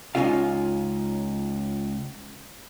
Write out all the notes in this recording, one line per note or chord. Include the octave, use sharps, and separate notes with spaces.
C#2 E3 C#4 D#4 F4 F5